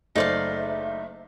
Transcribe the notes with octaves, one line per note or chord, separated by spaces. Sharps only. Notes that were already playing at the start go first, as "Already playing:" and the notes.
F#1 A3 D#4 C5 D5 E5 F5